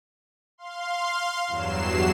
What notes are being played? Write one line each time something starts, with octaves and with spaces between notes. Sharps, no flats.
F5 C6
E2 G2 F#3 C7 E7